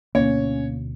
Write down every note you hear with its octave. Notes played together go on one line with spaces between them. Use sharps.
D2 B2 A#3 C#4 C#5